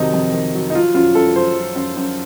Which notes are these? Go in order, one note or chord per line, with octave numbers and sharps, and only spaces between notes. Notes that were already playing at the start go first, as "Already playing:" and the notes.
Already playing: F2 C3 D#3 F#3 D#4
F2
D#3
F#3
D#4
F3 F4
F#2 F4
F#2 A4
F3 C5
F3
F#2
F#2